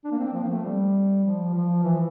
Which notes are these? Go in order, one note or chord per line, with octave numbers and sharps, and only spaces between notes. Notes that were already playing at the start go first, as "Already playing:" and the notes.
D4
A#3
C4
F3
A#3
A3
G3
F3
F3
E3